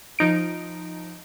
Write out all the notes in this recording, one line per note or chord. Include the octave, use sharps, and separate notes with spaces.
F3 D#4 D7